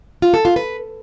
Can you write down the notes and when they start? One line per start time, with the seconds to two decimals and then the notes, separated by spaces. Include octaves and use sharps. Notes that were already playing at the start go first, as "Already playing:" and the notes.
0.22 F4
0.34 A4
0.45 F4
0.56 B4